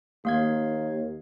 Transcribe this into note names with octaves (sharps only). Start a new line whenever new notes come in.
D#2 A#3 F5 G#6